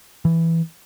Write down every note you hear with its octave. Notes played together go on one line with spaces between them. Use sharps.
E3